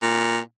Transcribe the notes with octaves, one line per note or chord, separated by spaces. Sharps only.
A#2